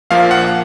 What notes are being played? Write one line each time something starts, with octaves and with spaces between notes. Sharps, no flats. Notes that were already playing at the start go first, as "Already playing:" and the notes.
A#1 A#2 F3 A#3 F5
F#5